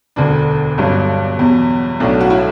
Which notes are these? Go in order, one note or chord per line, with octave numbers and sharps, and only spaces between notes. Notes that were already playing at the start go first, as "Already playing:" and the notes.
E1 D2 D3 D4
G1 G2 F#3
E2 B2 F#3
B1 A2 F#3 D4
F#4
E4